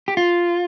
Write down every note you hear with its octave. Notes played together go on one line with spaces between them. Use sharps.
G4
F4